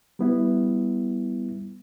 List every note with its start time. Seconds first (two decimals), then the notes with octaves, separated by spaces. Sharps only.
0.19 G3 B3 E4